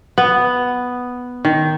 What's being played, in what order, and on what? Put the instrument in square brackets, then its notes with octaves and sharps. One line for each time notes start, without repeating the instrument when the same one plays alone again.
[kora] B3
D#3